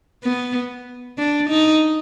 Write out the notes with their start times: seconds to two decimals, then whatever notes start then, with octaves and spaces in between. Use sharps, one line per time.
0.23 B3
1.19 D4
1.50 D#4